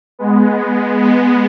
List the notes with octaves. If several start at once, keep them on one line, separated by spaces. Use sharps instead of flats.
G#3 B3
G#3 B3